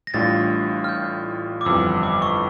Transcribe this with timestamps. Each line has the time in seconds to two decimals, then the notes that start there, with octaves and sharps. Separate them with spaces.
0.07 A#6
0.14 A1 A2 G3 D4 F4 A6
0.84 F6
0.89 G6
1.61 D6
1.65 G1 F2 E3 G3 E6
2.03 D6
2.22 C#6